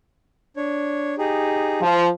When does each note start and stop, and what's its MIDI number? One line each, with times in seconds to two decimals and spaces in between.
0.57 1.15 62
0.57 1.15 73
1.18 1.81 63
1.18 1.81 67
1.18 1.81 68
1.81 2.08 53